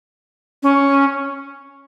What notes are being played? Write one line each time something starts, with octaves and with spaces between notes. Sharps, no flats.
C#4